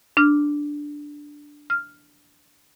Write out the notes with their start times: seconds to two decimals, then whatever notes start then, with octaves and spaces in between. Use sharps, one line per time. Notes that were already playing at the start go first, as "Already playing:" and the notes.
0.17 D4 F6
1.70 F6